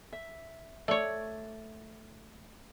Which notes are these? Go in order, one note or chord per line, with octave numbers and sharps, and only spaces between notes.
E5
A3 C#5 D5